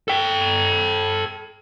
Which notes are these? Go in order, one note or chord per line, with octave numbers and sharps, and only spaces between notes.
A4 G5